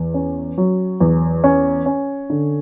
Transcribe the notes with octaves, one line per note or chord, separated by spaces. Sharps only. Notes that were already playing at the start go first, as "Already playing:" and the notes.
Already playing: E2
C#4
F#3
E2
C#4
C#4
D3